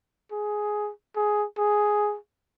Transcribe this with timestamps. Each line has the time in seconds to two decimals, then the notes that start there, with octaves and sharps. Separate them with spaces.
0.32 G#4
1.16 G#4
1.58 G#4